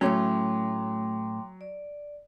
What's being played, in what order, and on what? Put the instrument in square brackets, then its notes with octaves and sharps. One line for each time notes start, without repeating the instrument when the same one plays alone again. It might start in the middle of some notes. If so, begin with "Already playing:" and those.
[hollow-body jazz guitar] A2 A3 C#4 [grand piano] F#3 [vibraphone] G5 C6 D6
[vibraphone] D5